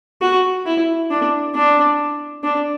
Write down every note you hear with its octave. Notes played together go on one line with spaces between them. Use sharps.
F#4
E4
D4
D4
D4